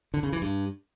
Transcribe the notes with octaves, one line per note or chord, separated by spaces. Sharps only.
D3
C#3
E3
G2